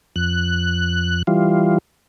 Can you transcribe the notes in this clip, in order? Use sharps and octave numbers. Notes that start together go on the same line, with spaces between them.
F2 F#6
E3 G3 F4